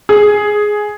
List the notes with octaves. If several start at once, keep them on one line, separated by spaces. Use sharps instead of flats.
G#4